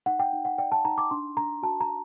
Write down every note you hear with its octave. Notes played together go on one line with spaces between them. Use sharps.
D#4 F#5
G5
D#4
F#5
D5 G5
A5
D#4 A#5
D6
D4 C6
D4 A#5
F#4 A5
A#5